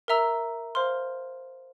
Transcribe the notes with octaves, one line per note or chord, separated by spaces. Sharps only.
A#4 E5 A#5 E6
C5 F5 C6 F6